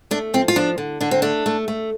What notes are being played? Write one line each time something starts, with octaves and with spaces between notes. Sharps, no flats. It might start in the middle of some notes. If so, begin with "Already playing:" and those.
A3 D4
F3 C4
F4
F3 D4
D3
D3 D4
C4
A3 D4
A3
A3